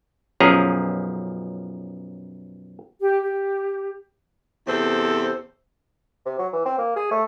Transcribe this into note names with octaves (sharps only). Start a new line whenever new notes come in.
B1 F#2 F3 C#4 G#4 A#5
G4
G4
E2 C3 A4 C5
C3
F#3
E3
C4
A#3
G#4
A3